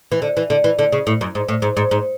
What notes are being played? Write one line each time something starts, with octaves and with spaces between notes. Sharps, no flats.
E3
D3
E3
D3
E3
D3
C#3
A2
F#2
G#2
A2
G#2
G#2
G#2